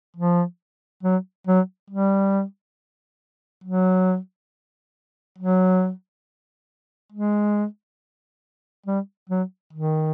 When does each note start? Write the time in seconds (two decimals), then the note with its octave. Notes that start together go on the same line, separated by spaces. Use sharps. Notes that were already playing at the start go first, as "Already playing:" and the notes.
0.17 F3
1.04 F#3
1.47 F#3
1.90 G3
3.64 F#3
5.38 F#3
7.12 G#3
8.86 G3
9.30 F#3
9.73 D#3